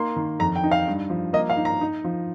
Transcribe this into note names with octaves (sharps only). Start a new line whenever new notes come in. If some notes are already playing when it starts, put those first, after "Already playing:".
Already playing: A#3 D#4 C6
D#3
F2 A#5
G5
D#4
F5
G2
F3
A#3 D#5
F5
D#4
A#5
D#4
F3